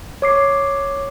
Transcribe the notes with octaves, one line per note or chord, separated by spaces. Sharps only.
C#5 D6 C7